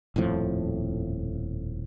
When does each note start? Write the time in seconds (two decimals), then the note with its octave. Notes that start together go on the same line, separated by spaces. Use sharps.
0.16 D#1 F2 A2 F3